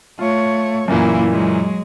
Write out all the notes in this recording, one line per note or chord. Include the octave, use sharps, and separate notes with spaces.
A3 F4 C#5
F#2 A#2 E3 A#3 E4
F#3 G#3